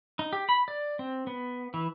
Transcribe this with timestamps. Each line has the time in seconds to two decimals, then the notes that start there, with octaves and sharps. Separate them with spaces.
0.19 D#4
0.33 G4
0.49 B5
0.68 D5
0.99 C4
1.27 B3
1.74 E3